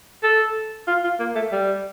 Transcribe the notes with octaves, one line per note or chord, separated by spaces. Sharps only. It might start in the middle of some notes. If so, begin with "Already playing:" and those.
A4
F4
F4
A#3
A3
G3